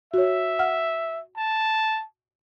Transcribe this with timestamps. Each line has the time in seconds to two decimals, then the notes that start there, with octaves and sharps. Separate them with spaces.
0.14 F#4 C#5 E5
0.59 F#5 F6
1.37 A5